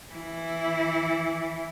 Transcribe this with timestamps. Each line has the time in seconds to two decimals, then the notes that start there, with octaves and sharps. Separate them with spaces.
0.13 E3 E4